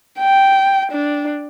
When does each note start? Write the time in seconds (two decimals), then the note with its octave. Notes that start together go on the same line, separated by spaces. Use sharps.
0.19 G5
0.92 D4